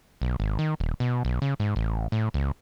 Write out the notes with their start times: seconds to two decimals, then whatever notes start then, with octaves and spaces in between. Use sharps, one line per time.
0.22 B1
0.40 G#1
0.59 D#3
0.80 D#1
1.00 B2
1.25 B1
1.42 C#3
1.60 G#2
1.76 A1
2.12 A2
2.34 C#2